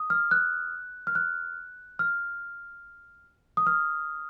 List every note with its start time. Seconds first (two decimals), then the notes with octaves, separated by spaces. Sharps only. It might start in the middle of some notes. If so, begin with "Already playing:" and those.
Already playing: D#6
0.10 F6
0.31 F#6
1.07 F6
1.15 F#6
1.99 F6
3.57 D#6
3.67 F6